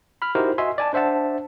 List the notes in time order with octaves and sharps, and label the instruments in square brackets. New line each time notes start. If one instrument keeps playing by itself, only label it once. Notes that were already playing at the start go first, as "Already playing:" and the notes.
[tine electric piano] B5 F6
D#4 E4 F#4 G4 A#4 C5
F#4 D#5 E5 G#5 C6
D5 G#5 A5
D4 C5 E5 F#5 A5